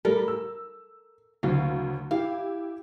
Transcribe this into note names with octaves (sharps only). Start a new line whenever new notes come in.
G3 A3 A4 A#4
E6
F#1 D2 F#3 F5
E4 G4 F5